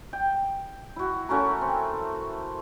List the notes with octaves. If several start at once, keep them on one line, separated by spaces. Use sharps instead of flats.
G5
E4 F#4
A3 C#4 F#4 A#4
C4